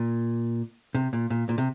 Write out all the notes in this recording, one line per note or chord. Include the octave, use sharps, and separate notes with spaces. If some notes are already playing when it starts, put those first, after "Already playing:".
Already playing: A#2
C3
A#2
A#2
A#2
C3